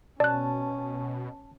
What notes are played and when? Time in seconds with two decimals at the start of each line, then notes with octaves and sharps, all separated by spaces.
0.20 B2 C#4 D5 A5 F#6